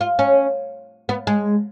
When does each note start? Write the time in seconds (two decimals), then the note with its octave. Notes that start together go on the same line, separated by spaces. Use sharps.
0.01 F4
0.19 C#4
1.09 B3
1.27 G#3